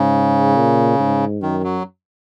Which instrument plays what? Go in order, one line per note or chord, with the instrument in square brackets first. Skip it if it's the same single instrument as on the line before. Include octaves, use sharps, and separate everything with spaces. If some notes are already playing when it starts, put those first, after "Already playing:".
Already playing: [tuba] G#2 [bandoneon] C#3
[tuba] A#2
G#2
[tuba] F#2 [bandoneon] D#3
[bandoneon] F#3